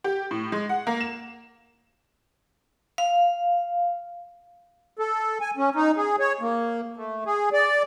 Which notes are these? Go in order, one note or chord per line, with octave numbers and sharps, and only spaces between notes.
G4
A2
G#3
F#5
A#3
E7
F5
A4
G#5
C#4
D#4
G#4
C#5
A#3
A3
G#4
D5